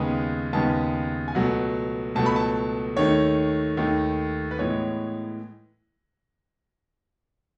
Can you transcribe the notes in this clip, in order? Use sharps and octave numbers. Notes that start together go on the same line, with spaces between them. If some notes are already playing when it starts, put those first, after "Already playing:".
Already playing: D#2 C#3 G#3 B3
D#2 C#3 G#3 B3 A5
G#5
C#2 B2 F#3 A3 F#5
C#2 B2 F#3 A3 A5
B5
A5
D#2 D#3 A3 C#5
D#2 D#3 A3
B4
A2 E3 G#3 B3 C#5